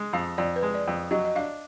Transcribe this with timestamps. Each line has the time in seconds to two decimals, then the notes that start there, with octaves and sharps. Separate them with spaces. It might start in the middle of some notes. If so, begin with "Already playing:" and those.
Already playing: G#3
0.13 F2 F5
0.38 F2 D5
0.56 B4
0.63 G#3
0.75 D5
0.88 F2
1.11 F#3 D#5
1.25 D#5
1.35 D4 F5